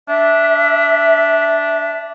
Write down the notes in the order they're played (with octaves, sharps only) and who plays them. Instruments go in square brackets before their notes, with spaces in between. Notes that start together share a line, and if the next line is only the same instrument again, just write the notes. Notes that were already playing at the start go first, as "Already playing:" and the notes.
[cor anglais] D4 [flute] E5